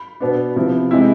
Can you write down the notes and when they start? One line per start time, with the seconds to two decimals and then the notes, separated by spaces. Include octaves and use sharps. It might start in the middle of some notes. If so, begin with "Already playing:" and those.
Already playing: B5
0.20 B2 B3 D4
0.56 C3 F3 B3 E4
0.91 C3 G#3 C4 E4